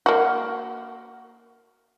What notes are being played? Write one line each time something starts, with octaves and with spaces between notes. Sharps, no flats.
A#3 F#4